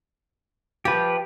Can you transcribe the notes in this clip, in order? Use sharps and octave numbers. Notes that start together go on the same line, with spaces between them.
F3 G4 B4